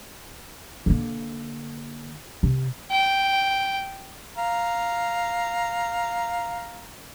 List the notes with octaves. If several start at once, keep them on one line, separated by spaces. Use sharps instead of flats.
D3 A#3
C3
G5
F5 A#5